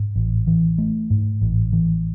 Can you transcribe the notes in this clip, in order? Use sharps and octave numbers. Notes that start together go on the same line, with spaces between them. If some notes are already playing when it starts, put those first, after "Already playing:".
Already playing: G#2
A1
E3
A3
G#2
A1
E3